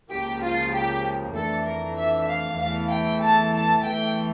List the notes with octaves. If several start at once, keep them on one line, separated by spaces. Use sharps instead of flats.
C#2 C#3 F3 A#3 G4
F4
G4
F2 E3 A3 D4 A4
A#4
E5
F5
E2 E3 A3 F5
G5
A5
A5
E2 E3 A3 G5